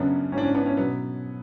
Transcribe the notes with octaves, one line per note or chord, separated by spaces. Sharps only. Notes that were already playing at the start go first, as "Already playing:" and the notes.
Already playing: F#2 C#3 F#3 B3 D4
G#2 E3 C#4 D4
C#4
B3 D4
C#4
B2 F#3 B3